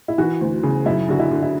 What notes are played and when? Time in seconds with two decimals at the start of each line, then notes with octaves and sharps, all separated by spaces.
0.08 E4
0.18 E3 F#4
0.41 D2
0.63 C#3
0.86 F#2 E4
1.08 D3 F#4
1.20 E4
1.31 D3
1.42 E4